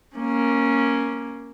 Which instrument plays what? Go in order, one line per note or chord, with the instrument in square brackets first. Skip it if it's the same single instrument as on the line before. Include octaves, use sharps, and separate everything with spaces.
[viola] A#3 C#4